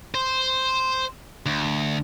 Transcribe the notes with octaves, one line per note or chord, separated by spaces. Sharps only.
C5
D2